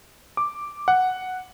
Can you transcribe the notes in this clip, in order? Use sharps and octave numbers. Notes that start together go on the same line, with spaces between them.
D6
F#5